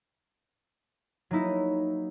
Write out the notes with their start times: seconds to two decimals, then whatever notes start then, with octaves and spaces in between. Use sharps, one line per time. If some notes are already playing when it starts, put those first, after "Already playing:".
1.31 F#3 A#3 D#4 E4